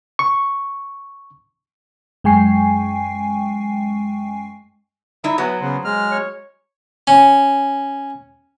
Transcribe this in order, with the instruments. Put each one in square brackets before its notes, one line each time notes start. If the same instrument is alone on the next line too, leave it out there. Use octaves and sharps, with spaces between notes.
[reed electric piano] C#6
[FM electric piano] F#2 G#3 G5 G#5 C#6 C7
[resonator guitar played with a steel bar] G3 D#4 E4 [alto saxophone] E5
[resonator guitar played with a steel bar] F#3 F#4 G#5 [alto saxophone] B3
[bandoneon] C#3 B3 [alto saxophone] C5
[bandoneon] G#3 F6
[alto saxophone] C#5
[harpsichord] C#4